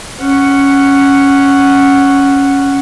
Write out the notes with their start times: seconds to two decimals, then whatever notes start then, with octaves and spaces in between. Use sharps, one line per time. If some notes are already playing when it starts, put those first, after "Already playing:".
0.20 C#4 F#5